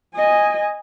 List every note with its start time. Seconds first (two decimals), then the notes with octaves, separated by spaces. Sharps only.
0.15 D#5 G#5